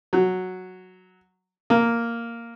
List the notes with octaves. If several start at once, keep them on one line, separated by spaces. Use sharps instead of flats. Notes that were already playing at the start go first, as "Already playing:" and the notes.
F#3
A#3